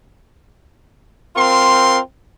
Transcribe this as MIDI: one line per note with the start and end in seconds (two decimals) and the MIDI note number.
1.36 1.99 60
1.36 1.99 65
1.36 1.99 70
1.36 1.99 84